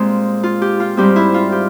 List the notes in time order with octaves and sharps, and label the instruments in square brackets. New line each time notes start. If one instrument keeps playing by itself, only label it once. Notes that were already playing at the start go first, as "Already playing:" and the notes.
Already playing: [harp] A#2 G#3 C4 G4
F4
G4
F4
G#2 G3 C4 G4
E4
F4
G4